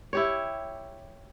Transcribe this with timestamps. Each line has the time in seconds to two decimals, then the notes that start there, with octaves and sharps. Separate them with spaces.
0.13 E4 G4 C#5